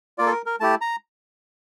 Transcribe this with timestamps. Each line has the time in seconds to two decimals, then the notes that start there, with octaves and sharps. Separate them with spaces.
0.18 A#3 F4 D5
0.26 A4
0.32 A#4
0.46 A#4
0.60 A3 E4 G4 A5
0.81 A#5